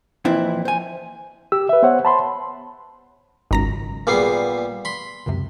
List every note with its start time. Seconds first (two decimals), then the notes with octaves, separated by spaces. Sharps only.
0.25 F2 A#2 E3 C4 E4
0.65 C5 G#5
1.52 G4 E6
1.69 B4 E5
1.82 B3 C5 C#5 F#5
2.05 A5 B5 C6
3.51 G#1 C#2 F#2 D#3 A#5 A#6
4.07 A#2 G3 A#3 B3 G#4 C7
4.85 B5 C6
5.26 C#2 F#2 C3